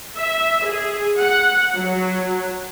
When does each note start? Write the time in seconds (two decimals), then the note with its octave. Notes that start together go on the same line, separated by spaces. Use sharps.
0.16 E5
0.64 G#4
1.18 F#5
1.76 F#3